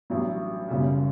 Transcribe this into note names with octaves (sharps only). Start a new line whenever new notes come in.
A1 G2 F#3
F#1 F#2 C#3 G3